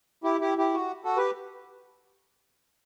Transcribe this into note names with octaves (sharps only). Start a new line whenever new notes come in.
E4 G4
E4 G4
E4 G4
F#4
F#4 A4
G4 B4